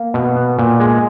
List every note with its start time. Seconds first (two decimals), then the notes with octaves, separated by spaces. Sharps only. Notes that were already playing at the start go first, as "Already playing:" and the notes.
Already playing: A#3
0.14 B2
0.36 B3
0.59 A#2
0.80 G#3